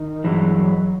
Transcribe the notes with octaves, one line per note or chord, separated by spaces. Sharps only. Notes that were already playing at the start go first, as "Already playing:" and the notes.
Already playing: D#3
G2 E3 F#3 G#3